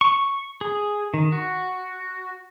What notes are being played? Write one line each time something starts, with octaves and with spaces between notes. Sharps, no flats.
C#6
G#4
D#3
F#4